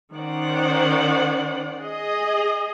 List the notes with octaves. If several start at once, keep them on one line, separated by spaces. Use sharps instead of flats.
D#3 C#4 C5 D5 F#5
G#4 D#5